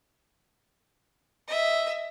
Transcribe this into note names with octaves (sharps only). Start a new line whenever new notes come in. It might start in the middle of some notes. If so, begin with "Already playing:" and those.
D#5 E5